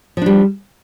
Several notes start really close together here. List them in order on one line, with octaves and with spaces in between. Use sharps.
F3 D4 G3